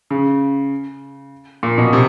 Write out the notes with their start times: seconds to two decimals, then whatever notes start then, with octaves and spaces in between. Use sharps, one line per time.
0.10 C#3
1.63 A#2
1.78 B2
1.93 C3